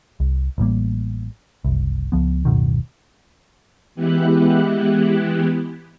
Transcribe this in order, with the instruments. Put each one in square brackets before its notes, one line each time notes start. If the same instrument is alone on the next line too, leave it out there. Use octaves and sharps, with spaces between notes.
[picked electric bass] C2
A1 A2 G3 A#3
F#1 C2
C#2 F3 B3
D1 F#2 B2 D#3
[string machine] E3 G#3 B3 E4 G4 F#6